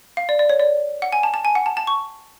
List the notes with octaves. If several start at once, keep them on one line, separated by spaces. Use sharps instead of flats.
F5
D5
D5
C#5
D5
F#5
G#5
A5
A5
G#5
F#5
A5
A5
C#6